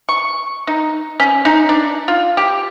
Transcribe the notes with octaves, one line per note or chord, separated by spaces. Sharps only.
C#6
D#4
C#4
D#4
D4
F4
G4